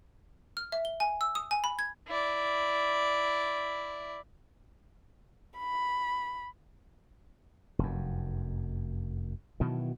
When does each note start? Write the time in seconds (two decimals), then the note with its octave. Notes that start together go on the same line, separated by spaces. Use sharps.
0.57 F6
0.72 E5
0.85 G7
1.00 G#5
1.21 E6
1.35 D#6
1.51 G#5
1.64 B5
1.79 G#6
2.07 E4 D5
5.58 B5
7.79 F1 F#2
9.60 B2 D#3 E3 F#3